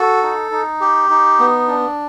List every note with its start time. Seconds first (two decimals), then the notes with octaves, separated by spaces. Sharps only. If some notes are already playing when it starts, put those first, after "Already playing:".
Already playing: F#4 A4
0.22 D#4
0.52 D#4
0.81 G4
1.10 D#4
1.39 B3
1.68 D4